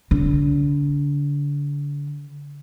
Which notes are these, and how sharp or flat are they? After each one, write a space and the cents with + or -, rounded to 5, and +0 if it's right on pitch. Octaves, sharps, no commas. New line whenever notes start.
D3 -35